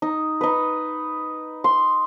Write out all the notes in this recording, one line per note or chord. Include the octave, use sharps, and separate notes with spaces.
D#4
D#4 B4
C6